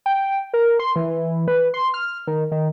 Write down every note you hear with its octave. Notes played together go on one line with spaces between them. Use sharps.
G5
A#4
C6
E3
B4
C6
F6
D#3
D#3